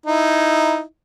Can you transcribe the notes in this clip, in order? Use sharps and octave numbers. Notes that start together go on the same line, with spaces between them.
D#4 E4